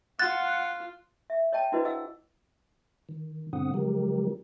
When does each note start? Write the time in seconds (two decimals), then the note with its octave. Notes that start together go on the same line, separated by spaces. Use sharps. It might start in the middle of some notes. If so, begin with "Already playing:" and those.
0.19 F4 F#5 F#6 A6
1.30 E5
1.53 C#5 D#5 G5 A5
1.72 D4 E4 F#4 B4 C5 D#5
1.85 G#4 D#5 F#5 E6
3.09 D#3
3.53 G2 B2 D3 C4 F#5 D#6
3.74 C#3 F3 F#3 G#3 G4 A#4